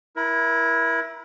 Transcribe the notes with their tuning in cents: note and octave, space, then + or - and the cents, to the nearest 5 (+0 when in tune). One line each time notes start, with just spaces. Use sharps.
E4 +0 A#4 +35